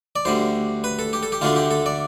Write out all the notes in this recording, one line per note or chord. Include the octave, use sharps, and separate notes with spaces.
D5
D2 D3 G3 C5
B4
A4
G4
A4
G4
D2 D3 A3 D4 F4
G4
A4
D5